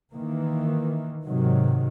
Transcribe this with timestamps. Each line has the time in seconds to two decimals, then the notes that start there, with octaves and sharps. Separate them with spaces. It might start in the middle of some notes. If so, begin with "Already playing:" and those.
0.14 D#3 E3 A#3
1.25 G#2 C3 D#3 F#3